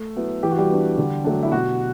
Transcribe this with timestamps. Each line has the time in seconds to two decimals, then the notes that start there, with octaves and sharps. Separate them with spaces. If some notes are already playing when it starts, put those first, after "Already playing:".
Already playing: A3
0.16 F#3 B3 E4
0.43 E3 G4
0.51 F#4
0.58 G3 G4
0.71 B3 D4
0.98 D3
1.24 F#3 A3 D4
1.43 E4
1.52 B2 F#4